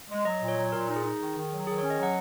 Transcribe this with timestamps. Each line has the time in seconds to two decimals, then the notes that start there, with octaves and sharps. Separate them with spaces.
0.09 G#3
0.25 F#3 D#5
0.41 A#2
0.48 C#5
0.56 F#3
0.72 A#2 A#4
0.88 D#4
0.96 G#4
1.04 D#4
1.20 D#3
1.36 D#3
1.51 F#3
1.67 D#3 G#4
1.78 C#4 C#5
1.90 D#5
1.99 F#3 F#5